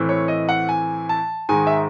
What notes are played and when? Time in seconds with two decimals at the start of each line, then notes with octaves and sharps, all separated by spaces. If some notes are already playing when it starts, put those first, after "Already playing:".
Already playing: A2 E3 C4
0.09 C#5
0.28 D#5
0.49 F#5
0.69 G#5
1.09 A5
1.49 G#2 D#3 G#3 G#5
1.67 E5